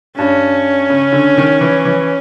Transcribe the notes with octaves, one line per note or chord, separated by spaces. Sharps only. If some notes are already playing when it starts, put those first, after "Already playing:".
G2 C#4
C#3
D3
D#3
E3
E3